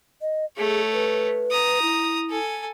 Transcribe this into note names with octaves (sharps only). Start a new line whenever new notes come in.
D#5
A3 G#4 C#5
B4
A#5 D#6
E4
A4 G#5